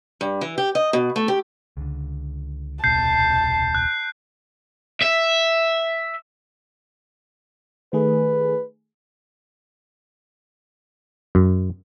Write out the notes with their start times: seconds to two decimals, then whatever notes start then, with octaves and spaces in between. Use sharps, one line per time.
0.21 G2
0.41 E3
0.58 G4
0.75 D#5
0.93 B2
1.16 A3
1.28 G4
1.77 C#2 D3
2.84 D#1 C2 B2 A5 G6 C7
3.75 F#6
5.02 E5
7.93 D#3 A3 G#4 B4
11.35 F#2